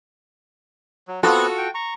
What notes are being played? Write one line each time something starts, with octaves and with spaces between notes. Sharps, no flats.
F#3
B3 C4 F4 F#4 A4 B4
G5
A#5 C#6